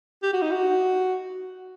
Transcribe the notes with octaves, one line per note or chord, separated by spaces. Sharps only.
G4
F#4
D#4
F#4